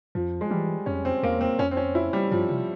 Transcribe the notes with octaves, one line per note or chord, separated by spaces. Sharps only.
F2 F3
G#3
E3 G3
F2 C#4
C4
E2 A#3
C4
F2 C#4
C4
C#4
E4
G3
G2 F3
C3